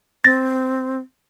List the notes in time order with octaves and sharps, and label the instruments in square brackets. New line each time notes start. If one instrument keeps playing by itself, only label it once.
[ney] C4 [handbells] A6 A#6